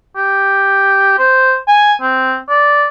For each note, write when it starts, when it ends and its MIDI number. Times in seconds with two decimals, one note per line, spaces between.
0.16 1.19 67
1.19 1.58 72
1.68 1.94 80
2.02 2.37 60
2.49 2.88 74